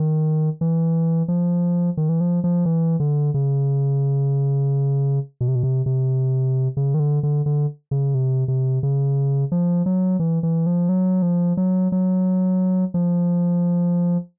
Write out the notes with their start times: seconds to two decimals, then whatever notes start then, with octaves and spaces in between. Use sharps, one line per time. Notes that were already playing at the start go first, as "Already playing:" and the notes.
Already playing: D#3
0.61 E3
1.28 F3
1.97 D#3
2.09 E3
2.21 F3
2.44 F3
2.65 E3
3.00 D3
3.34 C#3
5.41 B2
5.48 C3
5.55 B2
5.63 C3
5.86 C3
6.77 C#3
6.94 D#3
7.00 D3
7.23 D3
7.46 D3
7.91 C#3
8.15 C3
8.48 C3
8.83 C#3
9.52 F3
9.86 F#3
10.20 E3
10.43 E3
10.66 F3
10.89 F#3
11.22 F3
11.57 F#3
11.92 F#3
12.94 F3